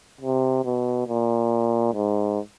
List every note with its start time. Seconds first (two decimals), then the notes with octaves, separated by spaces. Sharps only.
0.21 C3
0.65 B2
1.07 A#2
1.94 G#2